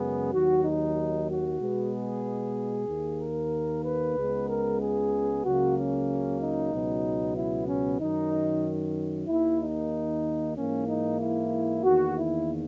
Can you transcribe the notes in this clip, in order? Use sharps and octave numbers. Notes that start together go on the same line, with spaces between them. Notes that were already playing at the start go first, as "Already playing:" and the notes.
Already playing: F#2 C#3 G#3 B3 G#4
D#2 D#3 F#3 F#4
D#4
F#4
B2 G#3 B3
G#4
D#2 D#3 A#3
A#4
B4
C#2 C#3 G#3 B3
A#4
G#4
C#2 C#3 F#3 A#3 F#4
C#4
D#4
C#2 B2 F#3 B3
E4
C#4
F#2 D#3 F#3 D#4
D#2 D#3 A#3 E4
D#4
G#2 E3 A#3 C#4
D#4
E4
E2 D#3 A#3 F#4
E4